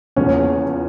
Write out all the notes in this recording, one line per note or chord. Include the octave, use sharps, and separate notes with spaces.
E2 C#3 F3 A#3 C#4